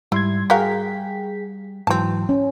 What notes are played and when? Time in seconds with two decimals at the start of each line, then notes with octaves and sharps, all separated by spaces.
0.12 G#2 G3 E4 C6 G#6
0.50 F#4 G#4 A#4 F5 G5 B6
1.87 G#2 E3 F#3 C4 A5
2.29 C#4